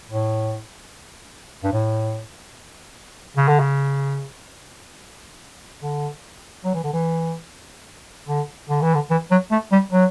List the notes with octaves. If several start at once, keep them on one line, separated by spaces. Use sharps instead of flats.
A2
G2
A2
C#3
D3
C#3
D3
F#3
E3
D3
E3
D3
D3
E3
D3
E3
F#3
A3
G3
F#3